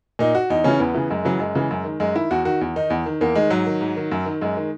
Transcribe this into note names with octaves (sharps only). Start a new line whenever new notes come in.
A#2 D#4
F#4
E2 D#4
C#3 E3 C#4
E2 B3
C#3 E3
F#2 G#3
C#3 E3 F#3
F#2 G#3
C#3 E3
F#2
D#3
F#2 G#3
D#3 E4
E2 F#4
D#3 F#4
E2
D#3 D#4
E2
D#3
E2 A#3
D#3 G#3
G#2 F#3
D#3
G#2
D#3
F#2
D#3
F#2 G#3
D#3